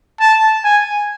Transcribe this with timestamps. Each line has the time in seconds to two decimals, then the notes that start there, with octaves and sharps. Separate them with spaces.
0.20 A5
0.64 G#5